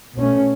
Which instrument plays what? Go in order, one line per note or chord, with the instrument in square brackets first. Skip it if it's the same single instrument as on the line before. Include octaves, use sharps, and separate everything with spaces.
[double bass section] B2 A3 C#4